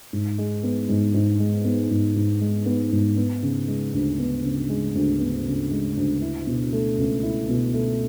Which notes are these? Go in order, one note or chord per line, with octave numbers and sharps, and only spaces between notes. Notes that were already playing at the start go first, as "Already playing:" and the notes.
G#2
G#3
B3
G#2
G#2
G#3
B3
G#2
G#2
G#3
B3
G#2
B3
C#3
G#3
D2
B3
C#3
G#3
D2
B3
C#3
G#3
D2
E4
B2
A3
C#2
E4
B2
A3